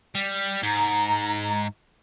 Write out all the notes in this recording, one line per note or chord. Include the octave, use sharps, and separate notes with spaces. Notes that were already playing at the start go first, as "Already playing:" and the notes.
G3
G#2 A#5